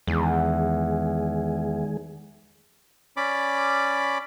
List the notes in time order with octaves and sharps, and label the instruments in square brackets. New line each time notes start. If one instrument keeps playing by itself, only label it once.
[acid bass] E2 [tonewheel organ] D#3 G#3 G#4
[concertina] C#4 D5 B5 D6